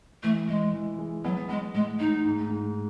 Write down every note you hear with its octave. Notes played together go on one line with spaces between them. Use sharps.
E3 A3
E3 G#3
E3
G#3
F#3 B3
G#3 B3
A2 G#3
A2 D#4
G#2
G#2